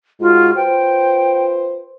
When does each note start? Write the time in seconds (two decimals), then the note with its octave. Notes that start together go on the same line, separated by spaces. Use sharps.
0.21 G#2 G#3 F4 F#4
0.56 F4 B4 C5 G5